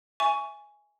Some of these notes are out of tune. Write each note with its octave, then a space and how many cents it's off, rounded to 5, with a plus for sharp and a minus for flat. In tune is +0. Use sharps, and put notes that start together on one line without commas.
E5 +0 G#5 +0 C#6 +20